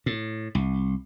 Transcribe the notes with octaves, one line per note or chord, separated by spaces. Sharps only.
A2
C2